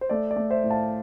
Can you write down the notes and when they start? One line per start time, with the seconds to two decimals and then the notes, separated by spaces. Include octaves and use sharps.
0.01 C5
0.10 A3 D5
0.31 D5
0.36 A3
0.50 C5 E5
0.64 A2
0.70 F5 A5